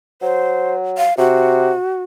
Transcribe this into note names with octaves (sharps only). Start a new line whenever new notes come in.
F#3 C5
F5
C3 F#4